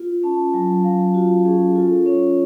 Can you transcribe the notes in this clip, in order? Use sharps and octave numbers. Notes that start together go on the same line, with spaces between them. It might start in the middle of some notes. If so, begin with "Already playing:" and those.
Already playing: F4
C#4 A5
F#3 G#5
F#3 F5
F4 F#4
C#4 G#4
F4 A4
C#4 C#5